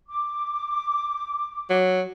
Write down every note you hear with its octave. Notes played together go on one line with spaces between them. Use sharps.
D6
F#3